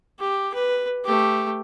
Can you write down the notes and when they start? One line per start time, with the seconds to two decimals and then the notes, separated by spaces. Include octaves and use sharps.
0.19 G4
0.54 B4
1.05 A3 G4